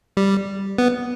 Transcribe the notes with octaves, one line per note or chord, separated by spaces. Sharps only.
G3
B3